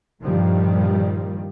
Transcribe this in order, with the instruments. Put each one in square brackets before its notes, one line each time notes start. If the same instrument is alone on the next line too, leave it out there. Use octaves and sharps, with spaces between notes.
[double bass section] G2 A#2 D#3 F3 G3